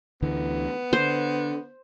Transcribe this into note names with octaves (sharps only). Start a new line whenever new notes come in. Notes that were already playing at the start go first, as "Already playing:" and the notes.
D2 D3 E3 B3
D3 C5